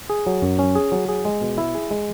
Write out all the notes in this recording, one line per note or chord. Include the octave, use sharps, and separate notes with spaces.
G#4
F#3
F#2
C#4
G#4
F#3
G#4
G#3
B2
E4
G#4
G#3